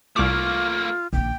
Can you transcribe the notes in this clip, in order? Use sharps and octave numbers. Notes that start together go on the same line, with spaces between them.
C2 A3 A#3 F4 D6
A#1 D#3 G5